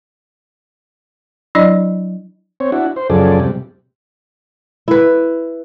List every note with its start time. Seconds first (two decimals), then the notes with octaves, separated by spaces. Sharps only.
1.55 F#3 D4 E4 D5 D#5
2.60 C4 C#5
2.72 D4 E4 F#4
2.96 C5
3.10 F#2 C#3 F3 G#4 A4 D5
3.40 C3 G3
4.88 E4 B4